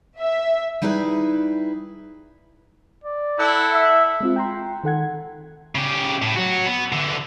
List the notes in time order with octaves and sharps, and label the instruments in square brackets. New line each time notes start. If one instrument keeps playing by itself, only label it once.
[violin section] E5
[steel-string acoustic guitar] G3 D#4 E4 G#4 B4
[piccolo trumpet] D5
[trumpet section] E4 A4 F#5
[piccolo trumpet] E5
[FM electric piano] G#3 C4 F4
G5 A#5 C6
D#3 A4 F#5 G#6
[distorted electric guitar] C#3 G4
A2
F#3 F#4
B3
D3 E3